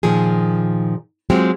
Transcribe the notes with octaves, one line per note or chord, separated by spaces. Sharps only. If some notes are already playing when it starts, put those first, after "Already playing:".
A#2 D#3 F3 G#4
F#3 G#3 C4 F4 G4